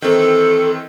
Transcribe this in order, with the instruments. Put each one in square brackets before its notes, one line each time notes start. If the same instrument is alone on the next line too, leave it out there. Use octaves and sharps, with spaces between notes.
[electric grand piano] D#3 E3 C4 [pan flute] A4